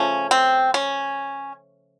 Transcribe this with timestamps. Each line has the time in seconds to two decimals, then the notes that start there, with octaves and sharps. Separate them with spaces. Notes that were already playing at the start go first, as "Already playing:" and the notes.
Already playing: C#3 F3 A3 C#4
0.31 C4
0.74 C#4